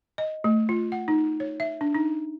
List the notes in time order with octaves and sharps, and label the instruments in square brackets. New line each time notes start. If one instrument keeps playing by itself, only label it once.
[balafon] D#5
A3
F4
F#5
D#4
C#5
E5
D4
D#4